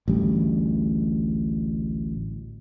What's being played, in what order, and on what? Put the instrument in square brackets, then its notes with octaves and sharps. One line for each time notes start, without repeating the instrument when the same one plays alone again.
[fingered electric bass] A1 D2 G3